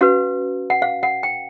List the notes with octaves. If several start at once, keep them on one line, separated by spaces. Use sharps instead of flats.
C#4 F#4 B4 F5
F#5
F5
F#5
G5